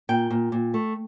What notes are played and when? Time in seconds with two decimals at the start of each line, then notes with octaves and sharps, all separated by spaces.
0.09 A#2 G5
0.30 A#2
0.52 A#2
0.74 A3